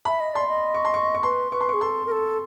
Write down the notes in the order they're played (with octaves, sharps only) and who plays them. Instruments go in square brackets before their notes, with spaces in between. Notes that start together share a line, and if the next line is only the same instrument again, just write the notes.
[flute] E5 [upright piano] B5
[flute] D#5
[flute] D5 [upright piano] C6
[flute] D#5
[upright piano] C#6
C6
C#6
C#6
[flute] B4 [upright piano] C6
[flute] B4 [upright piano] C#6
[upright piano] C6
C#6
[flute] G#4
[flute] A4 [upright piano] C6
[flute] A#4
A4